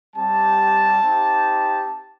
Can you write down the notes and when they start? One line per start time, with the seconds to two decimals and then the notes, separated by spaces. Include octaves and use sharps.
0.16 G3 C4 G4 A5
1.03 C4 D#4 G4